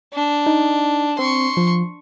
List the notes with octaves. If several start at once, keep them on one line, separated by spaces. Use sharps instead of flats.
D4
D#4
C4 C6 C#6
F3